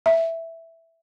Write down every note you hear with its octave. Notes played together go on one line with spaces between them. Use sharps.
E5